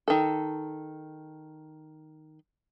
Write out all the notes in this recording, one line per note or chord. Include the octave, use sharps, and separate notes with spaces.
D#3 A4